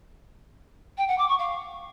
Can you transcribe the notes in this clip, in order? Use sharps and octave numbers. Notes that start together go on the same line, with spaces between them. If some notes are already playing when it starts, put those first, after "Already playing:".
G5
F#5
D6
C#6
F5